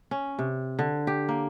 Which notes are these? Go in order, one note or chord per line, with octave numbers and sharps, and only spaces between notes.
C#4
C3
D3
G4
A#3